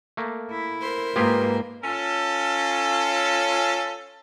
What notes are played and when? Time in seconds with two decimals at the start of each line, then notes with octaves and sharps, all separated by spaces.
0.17 A3 A#3
0.51 E4
0.81 A#4 C5
1.16 G#2 A#3 F4 G4 G#4 B4
1.83 C#4 F4 A4